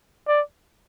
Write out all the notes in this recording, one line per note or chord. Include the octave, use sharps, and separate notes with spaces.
D5